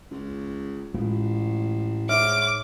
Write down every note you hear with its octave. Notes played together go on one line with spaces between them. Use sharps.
C#2
A1 A2 G#3 A3 F4
G#2 C#5 E5 D6 F6